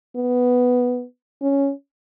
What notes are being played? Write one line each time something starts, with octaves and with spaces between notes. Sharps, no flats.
B3
C#4